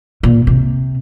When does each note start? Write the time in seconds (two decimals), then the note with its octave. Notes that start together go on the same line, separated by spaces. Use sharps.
0.23 A#2
0.47 C3